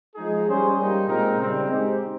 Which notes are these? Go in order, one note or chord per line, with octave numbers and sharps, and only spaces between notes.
F3 G#3 D#4 G#4
G3 C#4 G#4 C5
G3 A#3 D#4
A#2 G#3 C4 D#4 A#4
C#3 G3 C4
G#3 C4 D#4 G4